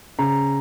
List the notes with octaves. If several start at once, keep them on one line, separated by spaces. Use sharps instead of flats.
C#3 A#5